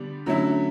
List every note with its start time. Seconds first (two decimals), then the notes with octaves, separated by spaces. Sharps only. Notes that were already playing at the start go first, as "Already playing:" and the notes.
Already playing: D3 G3 B3 D4
0.26 D3 F#3 A3 C#4 E4